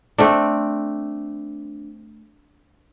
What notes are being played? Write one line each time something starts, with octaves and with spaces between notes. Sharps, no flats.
A3 C4 D4